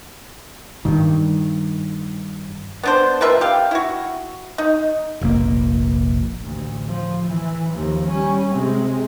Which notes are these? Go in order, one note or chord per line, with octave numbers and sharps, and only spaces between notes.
G2 D#3
B3 D4 C5
A#3 F4 B4 E5
G4 F5
E4 F#4
D#4
F1 A#1 A#3
A1 D2
F3
E3
D#2 F3
G3 C#4
C3 G#3